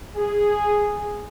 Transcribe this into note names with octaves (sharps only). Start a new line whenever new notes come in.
G#4